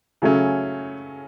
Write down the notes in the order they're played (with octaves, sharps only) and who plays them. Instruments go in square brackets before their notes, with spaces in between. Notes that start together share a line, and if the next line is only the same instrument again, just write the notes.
[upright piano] C#3 F#3 A3 C#4